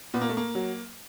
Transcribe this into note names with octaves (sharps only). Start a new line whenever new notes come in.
A#2 B3
A#3
A3
A#3
F#3